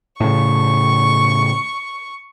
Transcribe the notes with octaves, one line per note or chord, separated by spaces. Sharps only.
A2 C#3 C#6